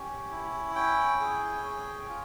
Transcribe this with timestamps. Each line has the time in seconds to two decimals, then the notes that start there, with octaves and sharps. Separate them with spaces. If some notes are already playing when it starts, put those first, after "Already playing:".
Already playing: C#4 G4
0.31 E4
0.75 C#4 G5
1.21 G#4
1.64 C#4
2.09 F4